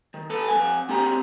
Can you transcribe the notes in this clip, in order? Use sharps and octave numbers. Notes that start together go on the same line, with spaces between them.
D#3
A4 B4 A5
F2 F3 G#5
D2 C4 G4 G5 A#5